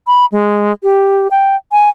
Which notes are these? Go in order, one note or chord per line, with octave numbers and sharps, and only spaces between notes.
B5
G#3
G4
G5
G#5